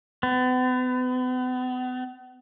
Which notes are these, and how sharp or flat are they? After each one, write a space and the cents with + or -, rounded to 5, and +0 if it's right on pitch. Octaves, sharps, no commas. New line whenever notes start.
B3 +40